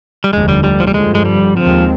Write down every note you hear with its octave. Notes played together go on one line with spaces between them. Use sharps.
G3
F1 D#2 D3 G#3
G3
G3
F3
G3
G2 D3 F3 G#3
G#3
G3
D#2 D#3 F3 G#3 C4